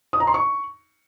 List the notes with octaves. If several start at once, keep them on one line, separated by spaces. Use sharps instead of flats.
D#6
A#5
C6
C#6